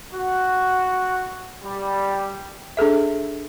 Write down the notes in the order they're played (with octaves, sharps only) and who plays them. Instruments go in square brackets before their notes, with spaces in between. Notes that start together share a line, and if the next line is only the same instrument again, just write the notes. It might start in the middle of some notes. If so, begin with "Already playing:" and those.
[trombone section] F#4
G3
[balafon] D4 G#4 A4 E5